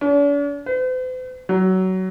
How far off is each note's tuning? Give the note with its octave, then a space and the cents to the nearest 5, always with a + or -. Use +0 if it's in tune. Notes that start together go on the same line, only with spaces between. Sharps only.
D4 -45
C5 -45
F#3 +20